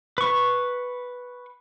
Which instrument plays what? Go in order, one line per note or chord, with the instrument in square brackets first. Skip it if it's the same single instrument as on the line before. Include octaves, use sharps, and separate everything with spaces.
[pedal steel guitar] B4 C#6